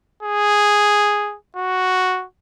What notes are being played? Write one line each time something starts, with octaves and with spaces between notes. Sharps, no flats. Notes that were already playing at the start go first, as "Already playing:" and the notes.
G#4
F#4